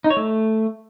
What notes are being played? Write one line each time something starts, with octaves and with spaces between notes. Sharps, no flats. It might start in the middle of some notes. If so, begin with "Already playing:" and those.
D#4
C#5
A3